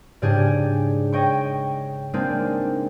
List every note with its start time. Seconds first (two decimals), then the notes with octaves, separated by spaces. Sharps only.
0.22 G#2 C#3 D4 G4 G#4
1.13 C#5 D#5 G5 C#6
2.13 G#3 A#3 C4 D4 D#4